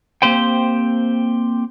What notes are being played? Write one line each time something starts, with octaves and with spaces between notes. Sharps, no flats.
A#3 C4 G4 C5 G5